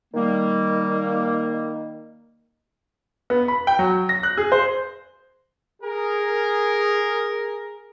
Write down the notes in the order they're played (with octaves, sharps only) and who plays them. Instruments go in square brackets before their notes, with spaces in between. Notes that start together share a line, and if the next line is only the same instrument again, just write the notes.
[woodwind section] D#3 G3 A#3
[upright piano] B3
B5
G5
F#3
A#6
F#6
G#4
C5
[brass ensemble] G#4 A#4